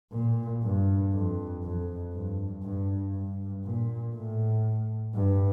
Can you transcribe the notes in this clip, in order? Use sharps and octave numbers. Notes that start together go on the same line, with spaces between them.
A#2
G2
F2
F2
G2
G2
G2
A#2
A2
G2